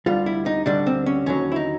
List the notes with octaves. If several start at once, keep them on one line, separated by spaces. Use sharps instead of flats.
D2 D3 G3 F4
E4
D#4
D2 D3 G3 D4
C4
C#4
D#2 D3 F#3 C#4
E4
D#4